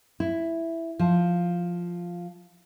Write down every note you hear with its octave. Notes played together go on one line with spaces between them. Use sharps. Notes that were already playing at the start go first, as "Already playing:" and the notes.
E4
F3